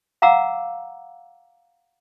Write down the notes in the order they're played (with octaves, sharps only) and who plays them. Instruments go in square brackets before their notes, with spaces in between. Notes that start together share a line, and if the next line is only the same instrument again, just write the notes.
[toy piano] F5 F#5 A#5 D6 E6